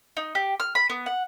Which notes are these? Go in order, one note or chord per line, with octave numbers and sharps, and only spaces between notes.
D#4
G4
F6
B5
B3
F#5